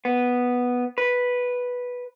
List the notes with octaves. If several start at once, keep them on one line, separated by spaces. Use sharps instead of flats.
B3
B4